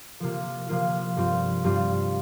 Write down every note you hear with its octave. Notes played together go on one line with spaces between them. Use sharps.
C3 F3 A#3 F4
C3 F3 A#3 F4
G2 G3 C4 F4
G2 G3 C4 F4